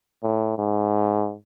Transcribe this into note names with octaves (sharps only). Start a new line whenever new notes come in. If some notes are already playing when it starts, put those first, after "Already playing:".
A2
G#2